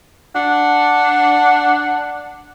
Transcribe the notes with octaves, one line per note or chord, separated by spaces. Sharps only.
D4 F#5